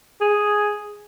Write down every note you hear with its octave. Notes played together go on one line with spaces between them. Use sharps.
G#4